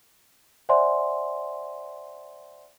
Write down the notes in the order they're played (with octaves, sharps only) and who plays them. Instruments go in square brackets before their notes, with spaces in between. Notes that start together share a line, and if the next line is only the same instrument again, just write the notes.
[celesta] C5 D5 E5 F#5 G#5 C6